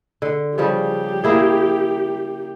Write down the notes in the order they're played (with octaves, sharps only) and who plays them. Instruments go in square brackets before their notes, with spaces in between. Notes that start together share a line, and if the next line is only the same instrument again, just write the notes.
[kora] D3
[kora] C#3 F3 G3 [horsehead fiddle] G4
[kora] A#3 E4 G#4